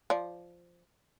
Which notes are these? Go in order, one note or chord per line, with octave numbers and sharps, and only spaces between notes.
F3 D5